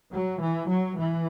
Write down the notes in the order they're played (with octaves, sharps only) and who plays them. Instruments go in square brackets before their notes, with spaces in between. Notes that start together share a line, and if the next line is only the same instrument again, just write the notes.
[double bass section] F#3
E3
F#3
E3